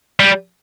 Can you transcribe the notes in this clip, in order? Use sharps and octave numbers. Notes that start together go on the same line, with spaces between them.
G3